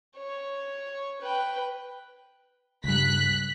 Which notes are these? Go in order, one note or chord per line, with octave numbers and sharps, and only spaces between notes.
C#5
B4 G5
C#2 G2 F#6 B6